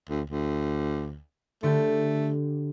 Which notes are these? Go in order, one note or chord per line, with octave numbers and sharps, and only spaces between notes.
D2
D2
D3 A3 G4